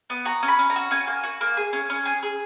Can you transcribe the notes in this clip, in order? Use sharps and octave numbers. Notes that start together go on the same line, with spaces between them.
B3
F#4 A#5
C#4
B5
C#4
A#5
F#4
C#4 G#5
A#3
F#4
A#3
G#4
C#4
C#4
G#4
G#4